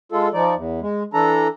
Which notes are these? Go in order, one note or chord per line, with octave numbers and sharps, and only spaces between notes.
G#3 F4 A4
F3 D#4 D5
E2
G#3
E3 D4 A4 A#5